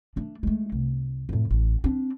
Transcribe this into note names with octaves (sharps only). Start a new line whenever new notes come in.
A3 D4
G#3 A3
C2
F2 A2
A1
C4 D4